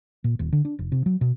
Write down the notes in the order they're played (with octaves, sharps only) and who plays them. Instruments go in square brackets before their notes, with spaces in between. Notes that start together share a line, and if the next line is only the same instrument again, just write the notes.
[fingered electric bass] A#2
D#1
D3
D4
F1
C3
F#3
B2